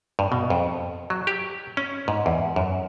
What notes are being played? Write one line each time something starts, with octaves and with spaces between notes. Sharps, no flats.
G2
B2
F2
F#3
G4
C#4
G#2
E2
F#2